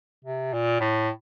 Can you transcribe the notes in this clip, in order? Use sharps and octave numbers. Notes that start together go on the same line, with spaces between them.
C3
A#2
A2